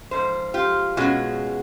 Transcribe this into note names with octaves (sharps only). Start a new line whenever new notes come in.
G#2 F3 C5
F4 G4
B2 G#3 C#4 F4 F#4 G#4